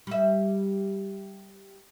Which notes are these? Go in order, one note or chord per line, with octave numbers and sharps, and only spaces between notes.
G3 E5